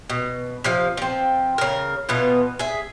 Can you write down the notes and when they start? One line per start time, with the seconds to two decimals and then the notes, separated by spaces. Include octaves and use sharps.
0.10 B2
0.64 C3 F3 F5
0.97 F3 C4
1.58 C#3 A#4
2.09 B2 E3 B3 F4
2.59 G#4 E5